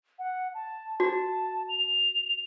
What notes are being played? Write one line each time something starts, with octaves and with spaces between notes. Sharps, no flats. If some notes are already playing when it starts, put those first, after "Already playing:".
F#5
A5
F#4 A5
F7